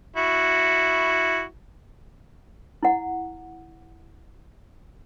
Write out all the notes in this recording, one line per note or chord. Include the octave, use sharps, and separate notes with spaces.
E4 F#4
E4 F#5